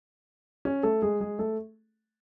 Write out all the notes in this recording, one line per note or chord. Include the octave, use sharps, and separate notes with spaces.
C#4 C#5
A3 A4
G#3 G#4
G#3 G#4
A3 A4